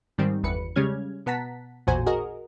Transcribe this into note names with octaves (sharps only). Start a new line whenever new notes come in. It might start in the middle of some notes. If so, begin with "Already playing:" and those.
G#2 D#3 G3 C4
G1 E2 B4 C#7
C#3 G3 G#3 C#4 F6 G#6
B2 B3 F#5 A5 A#5 B6
A1 E2 A#2 F#4 C5 G#5
F#4 G#4 A#4 D#5